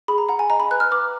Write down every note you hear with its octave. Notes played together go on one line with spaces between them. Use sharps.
G#4 B5
A#5
F#5 A#5
G#5
D#5 A#5
B5
B4 F#6
F6
B4 D6